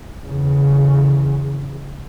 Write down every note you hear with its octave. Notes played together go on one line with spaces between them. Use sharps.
E2 C#3